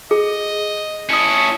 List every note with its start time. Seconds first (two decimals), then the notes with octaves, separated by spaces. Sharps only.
0.11 G#4 D#5
1.09 C#4 E4 A5 D#6 C#7